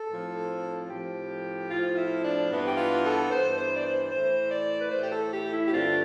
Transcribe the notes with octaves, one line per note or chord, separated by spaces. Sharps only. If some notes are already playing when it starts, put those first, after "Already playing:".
Already playing: A4
A2 F3 C4
A2 F3 C4 G4
A2 F3 C4 F4
F4
E4
D4
G2 E3 B3
G4
F4
A4
G2 E3 B3 C5
C5
D5
C5
A2 E3 A3 C5
D5
B4
A2 E3 A3 C5
G4
A4
G4
E4
G4
G2 D3 A3 C4 F4